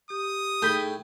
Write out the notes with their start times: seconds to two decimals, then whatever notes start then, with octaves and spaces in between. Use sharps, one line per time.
0.10 G4 D#6
0.62 A2 D#4 G#4 A4 G5 B5